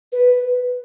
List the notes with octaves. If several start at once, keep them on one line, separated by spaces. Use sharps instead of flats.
B4